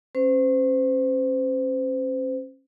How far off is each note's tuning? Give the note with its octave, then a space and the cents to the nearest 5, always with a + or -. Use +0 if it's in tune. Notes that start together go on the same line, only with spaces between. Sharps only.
C#4 -35 C5 -30